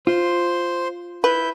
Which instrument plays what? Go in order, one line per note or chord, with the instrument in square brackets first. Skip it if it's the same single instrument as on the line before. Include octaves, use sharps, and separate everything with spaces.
[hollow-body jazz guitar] F4 [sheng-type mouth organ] C5 C6
[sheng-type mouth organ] E4 E5 G6 [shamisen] B4